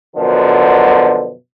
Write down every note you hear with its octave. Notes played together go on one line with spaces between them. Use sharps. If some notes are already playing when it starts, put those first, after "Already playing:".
F#2 B2 D3 F3